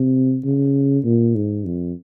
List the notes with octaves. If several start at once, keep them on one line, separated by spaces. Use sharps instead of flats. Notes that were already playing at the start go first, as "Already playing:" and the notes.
Already playing: C3
C#3
A#2
G#2
F2